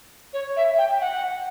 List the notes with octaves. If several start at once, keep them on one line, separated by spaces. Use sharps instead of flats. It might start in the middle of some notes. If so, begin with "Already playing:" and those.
C#5
E5
G5
F#5